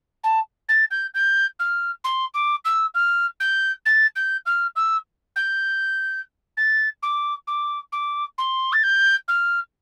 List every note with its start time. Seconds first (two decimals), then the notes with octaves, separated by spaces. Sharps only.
0.24 A5
0.69 A6
0.91 G6
1.14 G6
1.59 F6
2.04 C6
2.34 D6
2.65 E6
2.95 F6
3.40 G6
3.86 A6
4.16 G6
4.46 F6
4.76 E6
5.36 G6
6.57 A6
7.03 D6
7.47 D6
7.92 D6
8.38 C6
8.73 A6
8.83 G6
9.28 F6